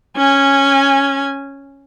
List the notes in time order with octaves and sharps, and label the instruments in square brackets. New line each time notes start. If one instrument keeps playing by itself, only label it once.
[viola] C#4 G#5